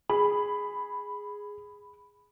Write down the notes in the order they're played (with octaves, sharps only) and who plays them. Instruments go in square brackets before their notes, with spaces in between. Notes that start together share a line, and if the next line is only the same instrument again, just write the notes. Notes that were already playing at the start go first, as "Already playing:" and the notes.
[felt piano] G#4 [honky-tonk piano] B5